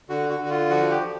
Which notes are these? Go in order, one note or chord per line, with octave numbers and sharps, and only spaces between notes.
D3 F#4
F#4
D3 F#4
F4
F3 F#4
G4
F3